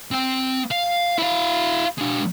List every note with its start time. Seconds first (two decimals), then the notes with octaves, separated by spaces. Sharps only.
0.12 C4 G5
0.72 F5
1.18 E4 F5
1.98 G#3 D4